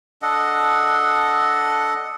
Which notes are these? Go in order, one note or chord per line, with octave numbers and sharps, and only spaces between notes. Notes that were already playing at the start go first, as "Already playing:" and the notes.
D4 A4 D#5 F#5